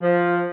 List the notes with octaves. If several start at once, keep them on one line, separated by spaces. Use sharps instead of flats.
F3